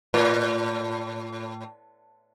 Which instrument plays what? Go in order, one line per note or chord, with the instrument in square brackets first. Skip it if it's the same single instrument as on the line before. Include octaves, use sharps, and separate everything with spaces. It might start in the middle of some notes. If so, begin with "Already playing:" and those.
[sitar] A2